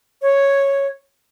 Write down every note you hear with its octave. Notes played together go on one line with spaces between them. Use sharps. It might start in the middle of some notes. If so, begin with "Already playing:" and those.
C#5